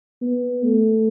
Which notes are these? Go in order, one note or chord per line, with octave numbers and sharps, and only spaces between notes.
B3
A3